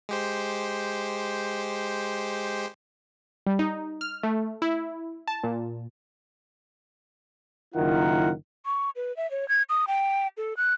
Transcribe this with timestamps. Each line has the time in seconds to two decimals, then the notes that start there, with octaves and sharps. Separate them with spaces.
0.09 G#3 G4 C5
3.46 G3
3.59 D#4
4.01 F6
4.23 A3
4.62 E4
5.28 A5
5.43 A#2
7.75 F#1 D#3 E4 F4 A#4 F#5
8.66 C#6
8.96 B4
9.17 E5
9.31 C#5
9.49 G#6
9.69 D#6
9.88 G5
10.37 A4
10.57 F#6